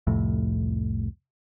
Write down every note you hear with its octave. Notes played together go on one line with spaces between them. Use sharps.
C2 F2 A2